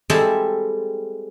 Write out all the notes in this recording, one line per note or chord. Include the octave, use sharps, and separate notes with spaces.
G3 G#3 C4 E4 A4 E5